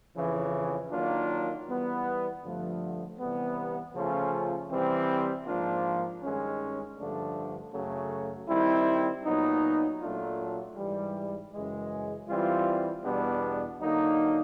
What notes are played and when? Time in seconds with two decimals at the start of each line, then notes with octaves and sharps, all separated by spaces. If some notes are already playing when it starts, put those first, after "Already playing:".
0.16 F2 C#3 E3
0.91 D#3 F#3 A#3 D4 F4
1.67 E3 G3 B3
2.43 G2 D3 F3 A3
3.19 C3 E3 G3 B3
3.94 C#3 F3 A3 C#4 F4
4.70 C3 E3 G3 C4
5.46 G#2 F3 A#3 D4 F4
6.21 G2 D#3 G#3 C#4
6.98 G2 D3 F3 A3 D4
7.74 F#2 C#3 F#3 A3
8.49 D#3 G3 C4 E4
9.25 A#2 F#3 B3 D#4
10.01 A#2 F#3 A3 D4 F4
10.76 G#2 E3 G3
11.53 F#2 C#3 E3 G#3
12.28 E3 G3 C4 F4
13.04 E2 B2 G3 B3 D4
13.80 D3 F#3 A#3 D#4